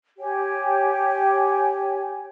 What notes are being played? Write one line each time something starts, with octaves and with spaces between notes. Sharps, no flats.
G4 C#5 G5 G#5